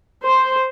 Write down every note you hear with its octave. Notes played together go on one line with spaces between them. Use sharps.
C5